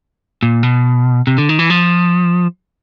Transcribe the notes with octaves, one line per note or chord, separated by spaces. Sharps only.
A#2
B2
C3
D3
D#3
E3
F3